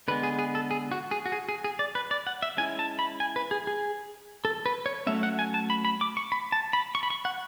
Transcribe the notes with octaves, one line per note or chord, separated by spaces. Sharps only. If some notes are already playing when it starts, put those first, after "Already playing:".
D3 G#3 B3 B4
G#4
G#4
A4
G#4
F#4
G#4
F#4
G#4
G#4
G#4
D5
B4
D5
F#5
E5
G#3 C#4 E4 G#5
A5
B5
G#5
B4
G#4
G#4
A4
B4
C#5
F#3 A3 C#4 E5
F#5
G#5
A5
B5
B5
D6
C#6
B5
A5
B5
C#6
B5
C#6
F#5